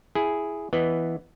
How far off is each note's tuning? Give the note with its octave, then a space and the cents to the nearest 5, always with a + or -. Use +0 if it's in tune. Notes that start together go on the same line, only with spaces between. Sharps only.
E4 +5 G#4 +0
E3 +0 B3 +0 D#5 -5